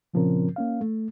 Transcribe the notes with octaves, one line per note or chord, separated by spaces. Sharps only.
A#2 C#3 F3 C4 C#4 A#4
A#3 C#4 F5
A3